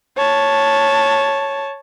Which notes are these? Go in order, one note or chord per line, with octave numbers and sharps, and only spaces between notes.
C#5 A5